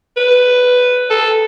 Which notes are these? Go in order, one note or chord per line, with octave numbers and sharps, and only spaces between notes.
B4
A4